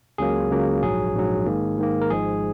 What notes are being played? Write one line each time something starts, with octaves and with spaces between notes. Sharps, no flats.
C#2 C#3 F#3 A#3 G#4
C#2 C#3 F#3 A#3
A#1 G#2 F#3 G#4
A#1 G#2 F#3
G#2 D#3 A#3
G#2 D#3 A#3
A#4
G#1 G#2 F3 G#3 G#4